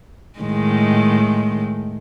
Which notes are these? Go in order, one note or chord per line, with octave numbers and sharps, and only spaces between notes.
A2 D#3 G#3